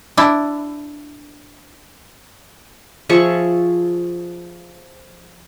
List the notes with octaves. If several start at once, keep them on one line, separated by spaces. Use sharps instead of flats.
D4 E4
F3 G#4 E5 C#6